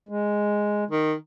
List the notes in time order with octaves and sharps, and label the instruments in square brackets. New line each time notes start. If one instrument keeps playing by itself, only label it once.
[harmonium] G#3
[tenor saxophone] D#3